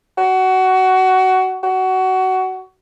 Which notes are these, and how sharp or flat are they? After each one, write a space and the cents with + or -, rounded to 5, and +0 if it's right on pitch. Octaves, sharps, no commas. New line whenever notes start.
F#4 +20
F#4 +20